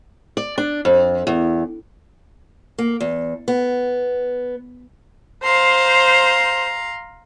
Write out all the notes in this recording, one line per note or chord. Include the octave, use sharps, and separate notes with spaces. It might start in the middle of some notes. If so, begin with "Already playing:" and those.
D5
D4
F2
E2
A#3
E2
B3
C5 F5 A#5 C6